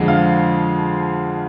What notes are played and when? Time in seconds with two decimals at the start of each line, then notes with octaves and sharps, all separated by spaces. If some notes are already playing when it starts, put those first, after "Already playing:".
Already playing: F2 D3 F3 G#3
0.08 F5